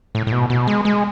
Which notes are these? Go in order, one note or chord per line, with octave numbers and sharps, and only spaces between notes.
A2
A2
B2
B2
G#3
G#3